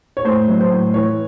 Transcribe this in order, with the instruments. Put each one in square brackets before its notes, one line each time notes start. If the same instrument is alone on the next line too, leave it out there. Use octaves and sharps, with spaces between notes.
[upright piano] C#5
A2 C5
F#3
C5
A2
E3 C#5